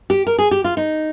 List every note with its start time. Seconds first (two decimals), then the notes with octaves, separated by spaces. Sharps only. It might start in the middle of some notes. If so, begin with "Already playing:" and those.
0.10 G4
0.27 A#4
0.39 G#4
0.51 G4
0.64 F4
0.77 D#4